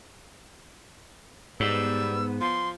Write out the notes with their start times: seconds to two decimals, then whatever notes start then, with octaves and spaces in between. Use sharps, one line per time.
1.60 G#2 G3 B3 E6
2.41 F3 C6